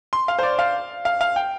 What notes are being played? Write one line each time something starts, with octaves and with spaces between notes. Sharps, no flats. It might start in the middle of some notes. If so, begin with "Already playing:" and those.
C6
F5
C5
D5
F5
F5
F5
G5